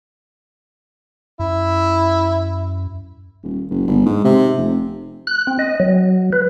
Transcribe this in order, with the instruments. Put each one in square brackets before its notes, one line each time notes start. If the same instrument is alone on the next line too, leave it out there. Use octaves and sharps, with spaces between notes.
[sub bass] F#2 [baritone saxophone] E4
[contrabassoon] D#1
F#1
G1
G#2
C3
F1
[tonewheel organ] F#6
C4
D#5
F#3
B4